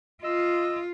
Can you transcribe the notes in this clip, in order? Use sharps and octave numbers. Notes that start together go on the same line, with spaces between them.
F4 D#5 E6